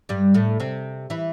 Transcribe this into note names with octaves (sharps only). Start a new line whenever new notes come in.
G2 G3
A2 A3
C3 C4
E3 E4